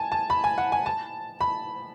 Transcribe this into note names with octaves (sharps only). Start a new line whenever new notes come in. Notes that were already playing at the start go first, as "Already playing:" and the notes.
Already playing: G#5 A5
A5
B5
G#5
F#5
G#5
A5
B5